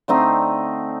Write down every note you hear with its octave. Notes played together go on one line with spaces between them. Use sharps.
D3 A3 C4 D#4